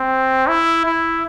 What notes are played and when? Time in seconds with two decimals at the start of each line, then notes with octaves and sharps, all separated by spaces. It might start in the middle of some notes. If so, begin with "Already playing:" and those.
Already playing: C4
0.48 E4
0.86 E4